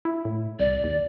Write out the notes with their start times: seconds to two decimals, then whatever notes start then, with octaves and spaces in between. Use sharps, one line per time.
0.05 E4
0.25 A2
0.60 C2 D5
0.84 D#2